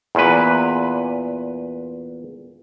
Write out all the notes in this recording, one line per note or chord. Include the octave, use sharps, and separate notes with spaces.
E2 A#2 B4